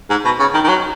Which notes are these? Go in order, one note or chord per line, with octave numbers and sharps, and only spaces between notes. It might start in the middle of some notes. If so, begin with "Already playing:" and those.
G#2
B2
C#3
D#3
D#3
F#3